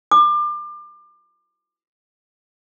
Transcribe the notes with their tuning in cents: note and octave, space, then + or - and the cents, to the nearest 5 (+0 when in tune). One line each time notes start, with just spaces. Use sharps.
D6 +30